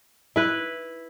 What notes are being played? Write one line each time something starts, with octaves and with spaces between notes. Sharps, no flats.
E4 B4